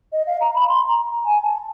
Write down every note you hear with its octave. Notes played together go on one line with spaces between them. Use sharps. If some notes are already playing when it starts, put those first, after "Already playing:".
D#5
F5
A#5
B5
C6
A#5
G#5
A5